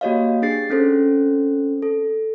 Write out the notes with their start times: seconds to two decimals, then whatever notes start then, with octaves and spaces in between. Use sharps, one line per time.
0.01 A#3 F#4 G4 C#5 D#5 F5
0.42 D4 G4 G#4 A6 C7
0.70 C4 C#4 A4 C5
1.82 A4